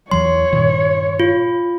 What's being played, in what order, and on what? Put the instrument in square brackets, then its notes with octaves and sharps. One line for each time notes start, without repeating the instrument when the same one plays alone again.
[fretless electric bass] E2 E3 F#3 [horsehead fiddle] C#5 [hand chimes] C6
[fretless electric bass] G2 A#2 D#3
[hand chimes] F4